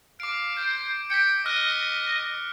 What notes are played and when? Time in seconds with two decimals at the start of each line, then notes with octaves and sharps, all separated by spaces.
0.20 F5 D6 D7
0.57 C5 D7
1.10 G5 B6 C#7
1.46 D#5 F6 F#6